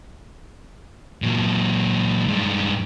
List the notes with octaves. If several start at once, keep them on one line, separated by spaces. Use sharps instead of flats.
A#2 F#3
G2 G#3